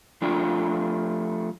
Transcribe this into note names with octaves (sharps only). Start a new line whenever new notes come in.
F3 A3 D4 F4 G5